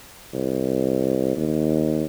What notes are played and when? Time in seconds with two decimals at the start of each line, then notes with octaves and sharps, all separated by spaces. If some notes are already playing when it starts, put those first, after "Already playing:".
0.34 C2
1.37 D#2